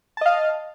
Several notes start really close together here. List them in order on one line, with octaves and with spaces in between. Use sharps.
A5 D#5 F5